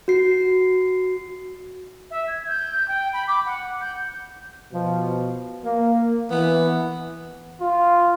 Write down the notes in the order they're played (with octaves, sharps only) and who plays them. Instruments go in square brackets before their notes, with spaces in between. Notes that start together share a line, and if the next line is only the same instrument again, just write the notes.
[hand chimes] F#4 C7
[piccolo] E5
G#6
G6
G5
B5
D6
F#5
G6
[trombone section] B2 F3
A#3
[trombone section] E3 [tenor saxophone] B3
[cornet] F4